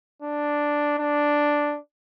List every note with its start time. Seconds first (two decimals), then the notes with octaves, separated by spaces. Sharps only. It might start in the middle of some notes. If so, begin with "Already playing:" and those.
0.22 D4
0.99 D4